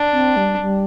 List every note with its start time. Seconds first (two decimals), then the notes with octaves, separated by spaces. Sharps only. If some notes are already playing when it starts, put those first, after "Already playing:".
Already playing: D4
0.12 C4
0.36 G3
0.60 G3